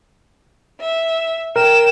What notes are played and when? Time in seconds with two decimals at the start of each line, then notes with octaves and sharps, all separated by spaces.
0.80 E5
1.56 A#4 G5 E7